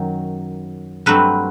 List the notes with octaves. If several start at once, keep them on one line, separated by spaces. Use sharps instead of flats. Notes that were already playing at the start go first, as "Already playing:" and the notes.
Already playing: F#2 D#3 F#3
G2 F#3 A3 C4 B4